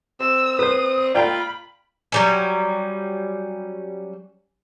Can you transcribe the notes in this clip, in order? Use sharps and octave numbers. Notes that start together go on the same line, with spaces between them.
C4 E6
B4 C5 D#6
F4 D5 G5 A#5 B5
F#3 G3 C#4